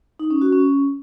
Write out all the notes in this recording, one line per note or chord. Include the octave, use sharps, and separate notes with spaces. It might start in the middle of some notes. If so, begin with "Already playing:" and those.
D#4
C#4
F#4
C#4